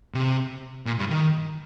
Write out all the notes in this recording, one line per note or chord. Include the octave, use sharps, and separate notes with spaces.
C3
A#2
G2
D#3